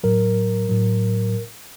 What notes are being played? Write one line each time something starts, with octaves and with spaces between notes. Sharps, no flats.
A2 F#3 A#4
A2 F#3